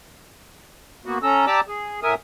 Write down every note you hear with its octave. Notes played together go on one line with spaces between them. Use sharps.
A#3 B3 F#4
C#4 A4 A#5 E6
G4 D5 A5 A#5 D6 E6
G#4
A2 A#4 E5 G#5 D#6